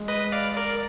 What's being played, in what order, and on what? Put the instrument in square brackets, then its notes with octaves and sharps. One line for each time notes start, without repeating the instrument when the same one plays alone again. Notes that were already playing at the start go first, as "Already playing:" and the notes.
Already playing: [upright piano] G#3
[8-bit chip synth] B4 D#5
D5 F5
A#4 D5